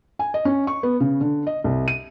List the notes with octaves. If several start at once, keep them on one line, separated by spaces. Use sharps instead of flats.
G#5
D#5
C#4
C#6
B3
C#3
D3
D#5
C2
D#7